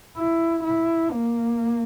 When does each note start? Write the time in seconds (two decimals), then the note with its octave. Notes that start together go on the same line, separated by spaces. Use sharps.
0.17 E4
0.63 E4
1.11 A#3